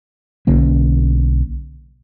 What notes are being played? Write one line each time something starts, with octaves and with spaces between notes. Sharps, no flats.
B1 D3 A#3 C#4